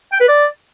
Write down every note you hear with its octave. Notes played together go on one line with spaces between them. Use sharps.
G5
B4
D5